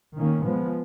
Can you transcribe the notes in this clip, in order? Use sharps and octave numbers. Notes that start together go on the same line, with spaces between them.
D#3 A#3 C#4
F3 G#3 B3